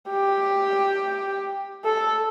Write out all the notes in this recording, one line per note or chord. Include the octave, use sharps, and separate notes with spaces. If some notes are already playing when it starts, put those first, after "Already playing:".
G4
A4